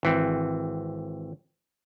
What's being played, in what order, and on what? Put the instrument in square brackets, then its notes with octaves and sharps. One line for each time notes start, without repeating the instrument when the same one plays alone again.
[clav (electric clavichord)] G#1 E3 C4